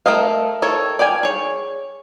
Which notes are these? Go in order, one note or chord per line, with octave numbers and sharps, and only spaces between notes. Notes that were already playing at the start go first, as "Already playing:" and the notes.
A3 A#4 D#5 F5
D#3 A4 A#4 C#5
D5 F5 G5 G#5
G#4 C#5